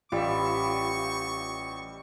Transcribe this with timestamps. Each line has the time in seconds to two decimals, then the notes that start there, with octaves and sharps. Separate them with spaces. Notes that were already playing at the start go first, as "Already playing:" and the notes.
0.12 A1 G3 F4 E5 C#6